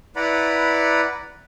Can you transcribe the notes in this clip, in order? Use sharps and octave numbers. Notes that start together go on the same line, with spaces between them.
E4 B4 D5 F#5 A#5 B5